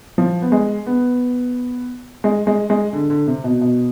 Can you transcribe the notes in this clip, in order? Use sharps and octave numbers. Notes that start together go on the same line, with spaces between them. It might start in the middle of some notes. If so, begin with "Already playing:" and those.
F3
B3
G#3
B3
G#3
G#3
G#3
D3
D3
C3
B2
B2